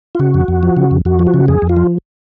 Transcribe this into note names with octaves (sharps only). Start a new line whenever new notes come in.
F4
C#3 F#4
F2
F2
F3
C#3
F2
F2 F#4
F3
F#4
C#3
F2 G#4
F2
F4
F3